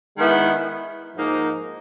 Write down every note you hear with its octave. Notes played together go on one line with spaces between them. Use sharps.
D#3 G#3 B3 E4
G#2 F3 A#3 D#4